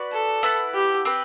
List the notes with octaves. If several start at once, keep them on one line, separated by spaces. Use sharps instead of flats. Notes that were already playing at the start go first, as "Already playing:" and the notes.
Already playing: F#4 B4 D5
A4
E4 B4 F#5 A5
G4
C4 G4 B4